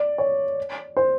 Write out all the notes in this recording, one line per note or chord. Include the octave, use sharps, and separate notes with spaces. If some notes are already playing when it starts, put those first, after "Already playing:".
Already playing: D5
C#5
C5